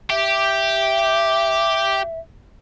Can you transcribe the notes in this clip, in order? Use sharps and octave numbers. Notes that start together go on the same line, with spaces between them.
G4 E5